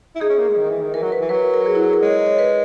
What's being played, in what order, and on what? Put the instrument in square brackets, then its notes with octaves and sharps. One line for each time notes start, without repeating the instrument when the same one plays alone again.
[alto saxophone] E4
[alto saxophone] D#4 [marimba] G#4
[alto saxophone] C#4
A#3
G#3
D#3
E3
D#3
[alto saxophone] E3 [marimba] A#4
[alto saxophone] F#3
[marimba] B4
[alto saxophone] E3
[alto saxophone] F#3 [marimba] B4
[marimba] A#4
A#4
G#4
E4
G#4
A#4
[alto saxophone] G#3 [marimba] C#5
[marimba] C#5
B4